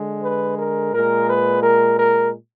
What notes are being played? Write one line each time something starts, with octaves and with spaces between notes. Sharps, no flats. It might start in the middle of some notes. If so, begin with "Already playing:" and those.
Already playing: D3 G#3
B4
A#4
A#2 G#3 A#4
B4
A#4
A#4